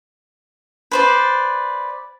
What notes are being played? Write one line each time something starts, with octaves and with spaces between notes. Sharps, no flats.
B4 C5 D5